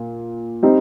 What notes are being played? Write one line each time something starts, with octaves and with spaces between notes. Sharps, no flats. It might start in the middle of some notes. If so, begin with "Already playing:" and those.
Already playing: A#2
G3 C4 D#4